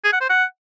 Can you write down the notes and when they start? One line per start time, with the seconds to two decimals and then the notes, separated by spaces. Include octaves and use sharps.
0.04 G#4
0.13 F#5
0.21 C5
0.29 F#5